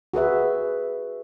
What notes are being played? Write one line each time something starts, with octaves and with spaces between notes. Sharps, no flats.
F#4 G#4 B4 E5